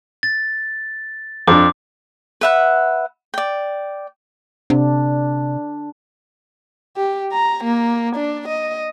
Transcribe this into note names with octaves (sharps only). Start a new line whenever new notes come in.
A6
F2 D4 D6
B4 E5 F#5
D5 G5
C3 D4
G4
A#5
A#3
D4
D#5